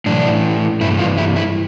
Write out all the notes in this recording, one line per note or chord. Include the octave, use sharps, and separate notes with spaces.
A2 E3 D4
G2 E3 E4
F4
E4
E4